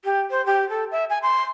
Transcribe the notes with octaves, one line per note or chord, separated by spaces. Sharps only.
G4
C5
G4
A4
E5
G#5
C6